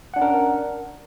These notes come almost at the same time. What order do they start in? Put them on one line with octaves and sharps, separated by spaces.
F#5 D4 C#4 A#4